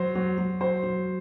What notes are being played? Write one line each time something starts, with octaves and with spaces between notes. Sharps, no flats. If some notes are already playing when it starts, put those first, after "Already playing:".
Already playing: F#3 C5
F#3
F#3
F#3 C5
F#3